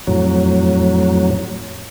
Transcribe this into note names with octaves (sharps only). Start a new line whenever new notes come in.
F2 A2 F#3